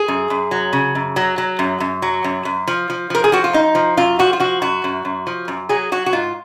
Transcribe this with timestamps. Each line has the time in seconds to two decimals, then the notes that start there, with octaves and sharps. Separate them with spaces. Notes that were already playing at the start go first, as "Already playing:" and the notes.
Already playing: G#4
0.08 F#2
0.30 F#2
0.51 F#3
0.73 C#3
0.95 F#2
1.16 F#3
1.38 F#3
1.59 F#2
1.80 F#2
2.02 F#3
2.24 F#2
2.45 F#2
2.68 F3
2.90 F3
3.10 F3 A#4
3.24 G#4
3.32 F3 F#4
3.44 F4
3.53 F#2 D#4
3.75 F3
3.97 F#2 F4
4.19 F3 F#4
4.33 F4
4.40 F3 F#4
4.62 F#2 F#4
4.84 F#2
5.05 F#2
5.27 F3
5.48 F#2
5.69 F#3 G#4
5.92 F#3 F#4
6.06 F#4
6.13 G#2 F4